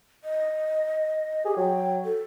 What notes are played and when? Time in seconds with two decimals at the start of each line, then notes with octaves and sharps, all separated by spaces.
0.24 D#5
1.46 G4 G#4
1.57 F#3 G5
2.05 A4